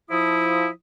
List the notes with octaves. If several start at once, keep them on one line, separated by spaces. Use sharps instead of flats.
F3 E4 D#6